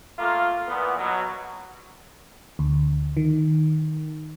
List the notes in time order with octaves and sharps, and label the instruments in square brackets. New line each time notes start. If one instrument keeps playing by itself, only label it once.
[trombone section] A3 A#3 F4
A#2 E3 B3
B2 F#3
[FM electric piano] D2
D#3